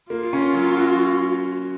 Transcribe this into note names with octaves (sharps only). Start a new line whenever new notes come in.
A#3 F4
C#4
F#3
F#4